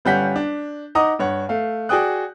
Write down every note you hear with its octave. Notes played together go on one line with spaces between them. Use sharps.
G1 G3 C#4 F#5 G6 B6
D4
D#4 D#5 F#5 A#5 D6 D#6
G2 C#5 F#5
A3 F5
F#4 G#4 D5 G5 D#6 F#6